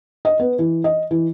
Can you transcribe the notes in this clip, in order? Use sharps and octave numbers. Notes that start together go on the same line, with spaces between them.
D#5
B3
E3
D#5
E3